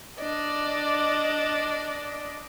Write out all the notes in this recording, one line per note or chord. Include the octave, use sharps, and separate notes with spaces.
D4 D5 D#5